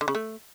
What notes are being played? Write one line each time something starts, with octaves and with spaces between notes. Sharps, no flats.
D3
C#3
A3